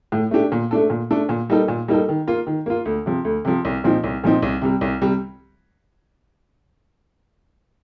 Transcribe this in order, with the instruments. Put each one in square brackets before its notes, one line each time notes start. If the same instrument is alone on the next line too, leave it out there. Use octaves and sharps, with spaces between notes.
[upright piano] A2
A3 D4 G4
A#2
A3 D4 A4
A#2
A3 D4 A4
A#2
G3 A#3 D#4 A4
A#2
G3 A#3 D#4 A4
D#3
A#3 F4
D#3
A#3 F4
D2
C3 F3
D2
C3 F3
C2
A#2 F3 C4 D#4
C2
A#2 F3 C4 D#4
C2
C3 G3
C2
C3 G3